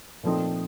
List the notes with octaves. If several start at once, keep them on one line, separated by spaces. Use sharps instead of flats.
A#2 F3 A3 C4 D#4